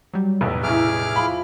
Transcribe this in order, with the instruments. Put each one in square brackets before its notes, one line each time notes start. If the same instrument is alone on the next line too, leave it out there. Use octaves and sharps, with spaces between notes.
[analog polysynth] F#3 G3
[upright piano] F1 B1 [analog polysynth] E2 A2
[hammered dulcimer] C#4 D#4 E4 [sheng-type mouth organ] G#4 D6 F6
[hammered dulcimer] F3 [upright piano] B5